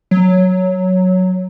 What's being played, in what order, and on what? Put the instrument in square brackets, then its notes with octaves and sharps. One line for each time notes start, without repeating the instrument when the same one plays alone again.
[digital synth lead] F#3